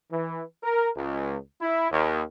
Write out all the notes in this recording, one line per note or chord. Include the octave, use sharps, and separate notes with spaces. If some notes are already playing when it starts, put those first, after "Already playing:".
E3
A#4
C#2
E4
D#2